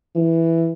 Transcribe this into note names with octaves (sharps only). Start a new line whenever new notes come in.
E3